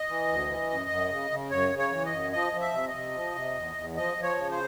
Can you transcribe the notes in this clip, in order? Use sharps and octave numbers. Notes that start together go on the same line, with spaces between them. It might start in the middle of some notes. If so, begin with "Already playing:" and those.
Already playing: D#5
E3
D2
E3
F#2
F#2
C#3
C#3
F#2 C#5
C#3
C#5
E3
D#5
F#2
F3 D#5
F3
E5
C3
D#5
C3
F3
C3
E2
E2
F3 D#5
F3
C#5
C#3
C5